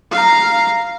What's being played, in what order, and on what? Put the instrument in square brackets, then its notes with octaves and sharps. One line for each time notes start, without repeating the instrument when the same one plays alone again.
[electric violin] F5 A#5